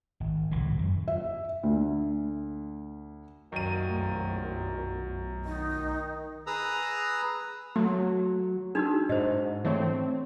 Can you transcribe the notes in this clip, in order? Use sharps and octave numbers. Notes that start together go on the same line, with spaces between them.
G#1
D#1 C#2 A2 E3
F#2
E5
D2
C2 F#2 A#2 D#3 D#7
B1 A3
D#3 D#4
G#4 B4 A#5 D#6 E6
F#3 A3 F#4
D4 D#4 F#4 G#4 E6
G#2 C5 D#5
E3 A3 C4 C#5